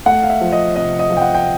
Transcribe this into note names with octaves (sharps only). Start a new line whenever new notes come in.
A3 F#5
F5
E5
F3
D#5
C3 D#5
D#5
F3
G5
F#5
G5